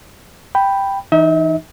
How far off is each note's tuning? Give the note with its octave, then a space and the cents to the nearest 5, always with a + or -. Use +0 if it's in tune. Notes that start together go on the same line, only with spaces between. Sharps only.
G5 +0 B5 +0
E3 +0 D#4 +0 E5 -40